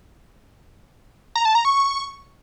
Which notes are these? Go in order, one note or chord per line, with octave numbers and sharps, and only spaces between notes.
A#5
A5
A#5
C#6